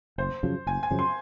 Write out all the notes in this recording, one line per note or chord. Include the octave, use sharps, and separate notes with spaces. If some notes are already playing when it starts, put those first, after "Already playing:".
F#1 C5
F#2 C#3 F3
F#1 G#5
G#5
F#2 C#3 F3
C6